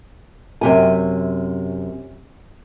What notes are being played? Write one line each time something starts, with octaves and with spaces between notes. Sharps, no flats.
F#2 C3 G#5